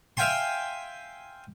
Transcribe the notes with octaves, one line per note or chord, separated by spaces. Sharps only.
E5 F5 G5 G#5 C6